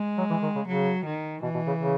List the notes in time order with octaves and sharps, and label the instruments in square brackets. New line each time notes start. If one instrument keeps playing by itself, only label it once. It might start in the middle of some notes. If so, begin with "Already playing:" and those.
Already playing: [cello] G#3
[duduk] F#3
E3
D#3
C#3
[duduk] C#3 [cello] F#3
[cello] D#3
[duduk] B2 [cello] E3
[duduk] B2
C#3
C#3